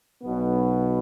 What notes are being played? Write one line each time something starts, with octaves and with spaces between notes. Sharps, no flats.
B1 B2 B3